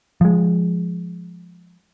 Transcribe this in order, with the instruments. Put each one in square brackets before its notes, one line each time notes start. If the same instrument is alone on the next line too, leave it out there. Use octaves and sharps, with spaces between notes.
[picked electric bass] F3 G#3